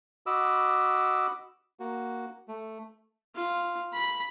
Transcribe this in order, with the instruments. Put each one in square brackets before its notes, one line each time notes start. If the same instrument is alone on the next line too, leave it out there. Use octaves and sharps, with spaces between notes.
[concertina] F#4 D#5 B5 D6 E6
A#3 F#4
A3
[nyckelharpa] F4
B5